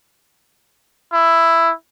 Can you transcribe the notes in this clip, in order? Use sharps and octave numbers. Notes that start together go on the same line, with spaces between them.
E4